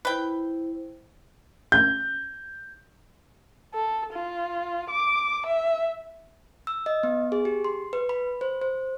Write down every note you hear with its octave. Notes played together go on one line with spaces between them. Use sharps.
E4 B4 C5 G5
G6
A4
F4
D6
E5
E6
D#5
B3
G#4
G4
C6
B4
B5
C5
C5